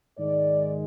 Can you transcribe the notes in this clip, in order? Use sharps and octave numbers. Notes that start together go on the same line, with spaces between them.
G#2 D#3 G#3 D5